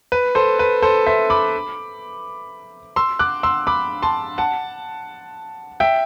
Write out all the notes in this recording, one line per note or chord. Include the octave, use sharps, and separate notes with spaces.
B4
A4 C5
B4
A4 C5
C5 E5
B5 D6
C6 E6
D6 F#6
C6 E6
B5 D6
A5 C6
F#5 A5
E5 G5